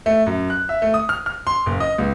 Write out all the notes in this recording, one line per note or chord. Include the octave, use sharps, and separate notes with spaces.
A3
F#2
F#6
E5
A3
D#6
F6
F6
C6
F#1
D#5
C#2